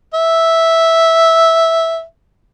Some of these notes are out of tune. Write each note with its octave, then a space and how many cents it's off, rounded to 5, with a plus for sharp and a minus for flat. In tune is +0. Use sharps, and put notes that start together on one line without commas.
E5 -5